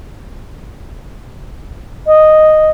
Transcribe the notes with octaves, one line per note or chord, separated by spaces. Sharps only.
D#5